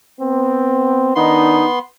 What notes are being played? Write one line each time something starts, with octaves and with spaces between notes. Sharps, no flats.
B3 C4
D#3 B3 D4 D#4 C6